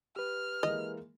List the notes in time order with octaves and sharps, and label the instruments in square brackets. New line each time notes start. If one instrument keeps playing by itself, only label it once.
[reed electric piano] G4 B4 [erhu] F6
[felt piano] E3 G#3 A#3 [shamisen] D#5